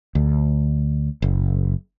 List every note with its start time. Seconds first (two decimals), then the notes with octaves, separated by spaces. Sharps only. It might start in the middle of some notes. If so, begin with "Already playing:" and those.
0.15 D2
1.22 F#1